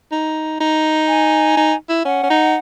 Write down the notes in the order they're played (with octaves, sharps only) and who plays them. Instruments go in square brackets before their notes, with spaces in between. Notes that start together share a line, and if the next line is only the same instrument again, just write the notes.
[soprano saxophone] D#4
D#4
[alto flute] G#5
[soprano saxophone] D#4
E4
[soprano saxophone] C#4 [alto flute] F#5
[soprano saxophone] C#4
D#4